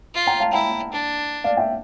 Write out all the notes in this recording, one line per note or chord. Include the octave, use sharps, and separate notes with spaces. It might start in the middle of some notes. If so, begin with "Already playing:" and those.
F4
G5 A#5
F5 A5
E4 G5 A#5
D4
D5 F5
E5 G5